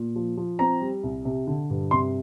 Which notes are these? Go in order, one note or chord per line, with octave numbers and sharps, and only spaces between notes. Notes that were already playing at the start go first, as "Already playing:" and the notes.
Already playing: A#2
F3
F3
C4 A#5
G3
C2
C3
D3
G2
C3 C6